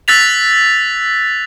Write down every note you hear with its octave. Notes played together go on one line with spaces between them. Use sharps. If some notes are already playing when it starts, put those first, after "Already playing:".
E6 F#6 A6 B6 F7